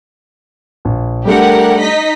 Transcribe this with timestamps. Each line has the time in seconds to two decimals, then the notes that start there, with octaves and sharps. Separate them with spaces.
0.85 A#1
1.25 G3 A3 D4 G4 A#4 F#5
1.81 D#4 D#5 B6